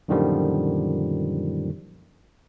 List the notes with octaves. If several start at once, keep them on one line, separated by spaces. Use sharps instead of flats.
F#2 A#2 D3 D#3 F3 G3